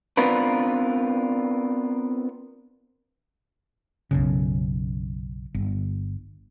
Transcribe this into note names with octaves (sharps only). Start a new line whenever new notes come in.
B3 C4 D4 F4 A#4 B4
B1 F#2 C#3
G1